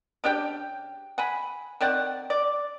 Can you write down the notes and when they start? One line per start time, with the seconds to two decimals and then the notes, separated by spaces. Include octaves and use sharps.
0.24 C#3 D4 G4 G5
1.18 F#5 G#5 B5
1.81 D#3 C4 D5 F#5
2.30 D5